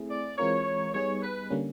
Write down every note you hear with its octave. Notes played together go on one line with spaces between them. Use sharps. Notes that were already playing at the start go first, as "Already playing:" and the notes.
Already playing: A3 C4 E4 G#4
D5
E3 G#3 C4 F4 A#4 C#5
G3 B3 D#4 G#4 C#5
B4
D3 G3 A#3 C#4